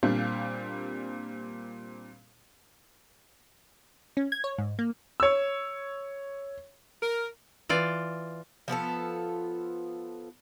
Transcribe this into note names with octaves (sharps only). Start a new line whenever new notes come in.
A#2 G3 C4 D4 F5
C#4
G#6
C#5
G#2
A#3
C#5 E6
A#4
E3 F4 D5
F3 B3 F4 A4